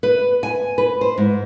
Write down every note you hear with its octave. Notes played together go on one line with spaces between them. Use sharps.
B4
G#5
B4
C5
G#2